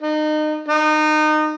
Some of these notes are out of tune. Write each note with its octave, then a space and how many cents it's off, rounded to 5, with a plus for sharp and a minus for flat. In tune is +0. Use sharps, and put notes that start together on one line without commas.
D#4 -30
D#4 -25